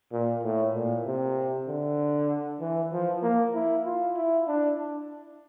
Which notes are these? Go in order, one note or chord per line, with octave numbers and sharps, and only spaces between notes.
A#2
A2
A#2
C3
D3
E3
F3
A#3
E4
F4
E4
D4